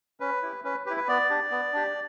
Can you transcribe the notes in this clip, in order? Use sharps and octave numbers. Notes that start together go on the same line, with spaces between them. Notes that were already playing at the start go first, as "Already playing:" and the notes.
C#4 B4
E4 G4
C#4 B4
E4 G4 B4
B4
B3 D5
D4 G4
B3
D4 G4